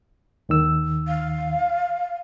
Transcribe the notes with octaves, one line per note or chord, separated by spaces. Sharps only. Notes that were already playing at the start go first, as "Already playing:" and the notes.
D#2 D#3 E6
F5